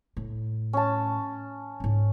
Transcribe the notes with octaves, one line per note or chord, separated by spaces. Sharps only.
A2
C#4 A5
G#2 C#4